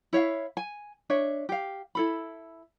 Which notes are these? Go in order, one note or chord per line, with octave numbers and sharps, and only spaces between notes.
E4 C#5 E5 F5
G#5
D4 C#5 E5
G4 F5
E4 A4 B5